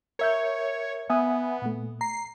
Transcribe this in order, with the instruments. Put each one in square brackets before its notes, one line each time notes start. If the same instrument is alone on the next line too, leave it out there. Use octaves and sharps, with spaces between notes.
[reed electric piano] A#4 E5 G6 [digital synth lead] C#5
[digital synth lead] B3 [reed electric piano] E5 G#5 D#6
[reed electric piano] A#2 A3
[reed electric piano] A#5 [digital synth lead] C7